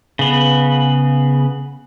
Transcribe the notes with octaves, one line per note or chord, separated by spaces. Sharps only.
C#3 B3